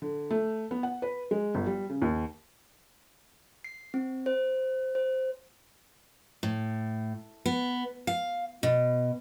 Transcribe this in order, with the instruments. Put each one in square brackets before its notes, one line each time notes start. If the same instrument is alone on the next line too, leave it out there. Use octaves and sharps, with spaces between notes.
[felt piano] D3
A3
B3
F#5
B4
G#3
G1
G3
C#3
D#2
[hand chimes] C7
C4
C5
C5
[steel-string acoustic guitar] A2
B3
F5
B2